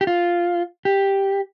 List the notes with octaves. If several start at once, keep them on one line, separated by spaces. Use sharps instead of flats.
G4
F4
G4